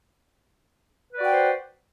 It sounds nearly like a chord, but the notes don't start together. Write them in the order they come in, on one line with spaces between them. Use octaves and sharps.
B4 D5 F#4 G5 C5